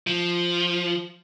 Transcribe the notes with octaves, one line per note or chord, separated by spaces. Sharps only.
F3